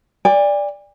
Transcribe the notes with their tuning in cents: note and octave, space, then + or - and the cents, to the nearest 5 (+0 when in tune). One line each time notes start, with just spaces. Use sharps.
D5 +0 G#5 -45